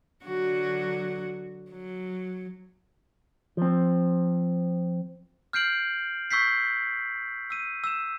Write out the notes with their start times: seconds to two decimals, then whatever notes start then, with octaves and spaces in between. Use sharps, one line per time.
0.25 D3 F#3 F#4
1.71 F#3
3.57 F3 C4
5.53 F6 G6 C7 D7 F#7
6.31 C#6 E6 G6 B6 C7
7.50 E6 D#7
7.84 E6 E7